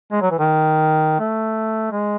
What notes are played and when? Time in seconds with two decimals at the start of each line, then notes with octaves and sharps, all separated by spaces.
0.12 G#3
0.22 F#3
0.31 E3
0.39 D#3
1.19 A3
1.91 G#3